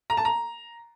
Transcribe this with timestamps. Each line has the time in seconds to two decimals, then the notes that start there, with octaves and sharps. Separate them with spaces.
0.10 A#5
0.17 A5
0.25 A#5